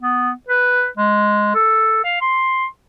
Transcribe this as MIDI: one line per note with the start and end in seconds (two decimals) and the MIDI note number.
0.01 0.32 59
0.48 0.88 71
0.97 1.51 56
1.55 2.02 69
2.04 2.17 77
2.21 2.66 84